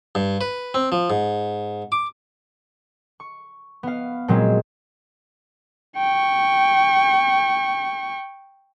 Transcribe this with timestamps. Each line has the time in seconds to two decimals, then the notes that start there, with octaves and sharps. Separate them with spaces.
0.15 G2
0.41 B4
0.74 C4
0.92 F3
1.10 G#2
1.92 D6
3.20 C#6
3.83 B3 F5
4.28 A#2 F#3 G#3 C4
5.98 G5 C#6